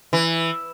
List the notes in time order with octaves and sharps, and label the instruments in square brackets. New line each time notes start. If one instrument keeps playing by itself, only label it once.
[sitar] E3